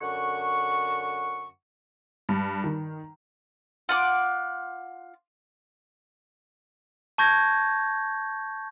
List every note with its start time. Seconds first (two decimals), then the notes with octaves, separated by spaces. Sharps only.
0.01 F#2 D3 F#5 C#6
2.29 G2
2.64 D#3
3.89 F4 F#5 D6
7.18 A5 C#6 G6 G#6 A#6